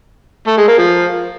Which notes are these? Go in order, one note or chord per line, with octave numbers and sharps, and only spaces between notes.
A3
G#3
A#3
F3